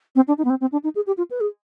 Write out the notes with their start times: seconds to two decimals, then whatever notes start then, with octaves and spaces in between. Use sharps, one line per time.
0.16 C4
0.28 D4
0.38 D#4
0.45 B3
0.50 C4
0.61 C4
0.72 D4
0.84 D#4
0.96 G#4
1.07 G4
1.18 F4
1.31 B4
1.41 G#4